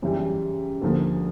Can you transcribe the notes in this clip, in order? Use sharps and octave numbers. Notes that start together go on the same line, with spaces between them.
F#2 C#3 E3 G3
D2 D3 F3 A#3